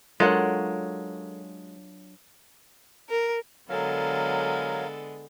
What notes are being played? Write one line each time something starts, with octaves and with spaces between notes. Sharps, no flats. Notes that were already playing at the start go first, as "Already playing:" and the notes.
F#3 G#3 D4 F4 A4 A#4 C#5 F#5
A#4
D3 F#3 G#3 B3 A4 A#4 F5